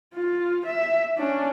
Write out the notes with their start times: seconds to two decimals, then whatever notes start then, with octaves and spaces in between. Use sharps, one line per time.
0.15 F4
0.67 E5
1.18 C#4 D4